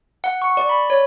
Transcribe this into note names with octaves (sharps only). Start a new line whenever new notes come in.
F#5
C#6
D5
B5
C#5